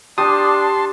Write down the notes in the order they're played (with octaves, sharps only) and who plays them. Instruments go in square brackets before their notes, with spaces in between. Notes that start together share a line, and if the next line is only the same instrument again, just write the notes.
[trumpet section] D4 [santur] G4 [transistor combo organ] A5 C6 [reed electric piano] D#6